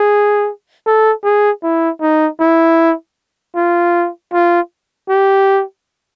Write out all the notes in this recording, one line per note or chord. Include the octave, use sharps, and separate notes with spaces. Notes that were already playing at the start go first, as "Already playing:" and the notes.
Already playing: G#4
A4
G#4
E4
D#4
E4
F4
F4
G4